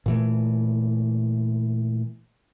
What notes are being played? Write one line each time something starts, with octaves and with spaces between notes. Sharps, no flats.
A#2 E3 A3